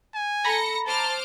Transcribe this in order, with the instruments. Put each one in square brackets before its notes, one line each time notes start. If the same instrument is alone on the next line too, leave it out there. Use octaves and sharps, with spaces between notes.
[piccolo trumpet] G#5
[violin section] A4 A#6 C#7 [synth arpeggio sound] A#5 B5
[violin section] C5 D6 F6 [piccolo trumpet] A5